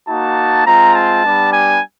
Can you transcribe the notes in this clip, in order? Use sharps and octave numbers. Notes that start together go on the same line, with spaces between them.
A#3 D#4 F#4 A5
G#3 C4 F4 A#5
A5
G3 B3 D4 G4
G#5